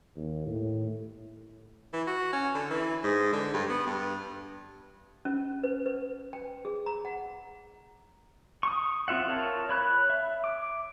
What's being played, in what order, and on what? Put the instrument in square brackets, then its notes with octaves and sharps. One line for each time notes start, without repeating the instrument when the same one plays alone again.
[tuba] D#2
A2
[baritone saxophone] E3
F#4
C#4
D3
E3
G#2
D3
G2
B3
G2
[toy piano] C#4
B4
B4
G5
G#4
A#5
F#5
[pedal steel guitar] C#6 D#6
C4 F4 E5 F#5
F4 A#4 C#5 A5
C#5 B5 F#6
E5
D6